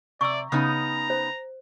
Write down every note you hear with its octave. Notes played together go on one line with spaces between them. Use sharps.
C3 D5 C#6 E6
C#3 B3 D#4 A#5
C5